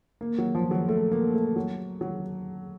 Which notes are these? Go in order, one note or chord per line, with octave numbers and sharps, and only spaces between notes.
A#3
F#3
F3
F#3
A3
A#3
A3
F#3
F#3